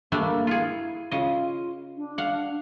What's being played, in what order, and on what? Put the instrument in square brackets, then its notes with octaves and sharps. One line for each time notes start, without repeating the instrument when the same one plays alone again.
[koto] G3 A3 D4 [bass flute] A#3
[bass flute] E4 [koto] F4 G#4
[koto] C#3 D#5 [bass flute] F4
[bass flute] D4
[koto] F5 F#5